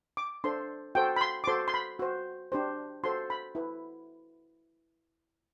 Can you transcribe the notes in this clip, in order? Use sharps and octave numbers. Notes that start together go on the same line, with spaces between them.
D6
D4 A4 C5 C6
F#4 A4 C5 G5
B5
C6
D6
F#4 A4 C5 C6
C6
B5
F#4 C5
D4 G4 C5
F#4 A4 C5 C6
B5
E4 B4